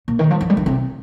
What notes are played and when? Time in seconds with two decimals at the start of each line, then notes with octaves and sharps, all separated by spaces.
0.08 A#2
0.19 D#3
0.30 F3
0.41 F3
0.50 G3
0.57 D#3
0.66 C3